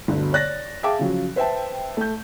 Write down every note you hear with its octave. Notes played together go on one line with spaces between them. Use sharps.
G1 D2 B2 D3
C#5 D5 F#6 A6 A#6
G#4 E5 F5 G5 A5 D6
C#3 F3 F#3
B4 C5 E5 G5 A5
A3 G6